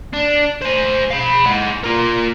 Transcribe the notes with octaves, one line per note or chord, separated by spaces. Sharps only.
D4
C5 G#5
F5 B5
G#3 F#5
F4 A#4